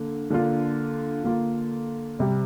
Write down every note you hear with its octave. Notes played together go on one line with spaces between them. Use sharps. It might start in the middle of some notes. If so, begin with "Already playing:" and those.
Already playing: D3 A#3
D3 A#3 D4 F4
D3 A#3 F4
C3 G3 C4